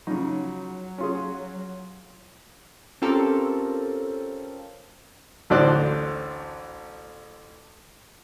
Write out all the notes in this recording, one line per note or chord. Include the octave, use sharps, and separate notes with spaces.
C#3 F3 F#3 D#4
C#4 F4 G#4
C4 C#4 F4 G4 A4 A#4
A1 D2 F#4 C5 D5 F#6